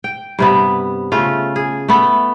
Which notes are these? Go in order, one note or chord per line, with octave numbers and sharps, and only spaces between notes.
G5
G2 C3 B3
C#3 A3 F4
G#4
A3 B3